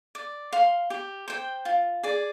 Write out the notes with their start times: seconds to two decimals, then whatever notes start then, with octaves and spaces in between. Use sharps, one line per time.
0.15 D5
0.53 F5 C6
0.90 G4
1.28 C5 G5
1.65 F4
2.03 G#4 D5